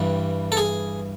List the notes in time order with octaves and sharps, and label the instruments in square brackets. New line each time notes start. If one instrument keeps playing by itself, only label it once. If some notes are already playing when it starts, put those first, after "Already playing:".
Already playing: [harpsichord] G2 E3 G3
A4
G#4